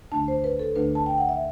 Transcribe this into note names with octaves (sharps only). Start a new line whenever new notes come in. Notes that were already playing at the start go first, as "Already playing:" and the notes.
D2 D3 A3 D4 A5
C5
B4
A4
D2 D3 A3 D4 B4
A5
G5
F#5
E5